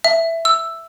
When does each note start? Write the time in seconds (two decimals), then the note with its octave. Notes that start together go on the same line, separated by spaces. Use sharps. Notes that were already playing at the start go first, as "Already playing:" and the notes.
0.04 E5
0.45 E6